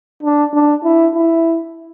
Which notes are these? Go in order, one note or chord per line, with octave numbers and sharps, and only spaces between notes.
D4
D4
E4
E4